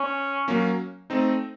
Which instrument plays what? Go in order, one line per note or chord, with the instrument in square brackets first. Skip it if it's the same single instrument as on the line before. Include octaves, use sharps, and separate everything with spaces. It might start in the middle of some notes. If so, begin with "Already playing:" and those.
Already playing: [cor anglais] C#4
[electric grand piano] F#3 A#3 C#4
A3 C4 D#4